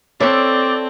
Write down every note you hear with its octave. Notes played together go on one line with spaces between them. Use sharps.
C4 D4 E4 A4 C#5 D5